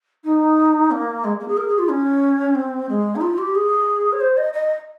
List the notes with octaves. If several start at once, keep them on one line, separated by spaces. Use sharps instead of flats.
D#4
A#3
G#3
A#3
G#4
A#4
G#4
F4
C#4
C4
G#3
D#4
F4
G4
G#4
C#5
C5
D#5
D#5